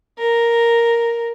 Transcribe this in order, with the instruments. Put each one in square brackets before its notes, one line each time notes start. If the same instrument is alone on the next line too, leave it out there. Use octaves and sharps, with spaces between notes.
[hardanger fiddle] A#4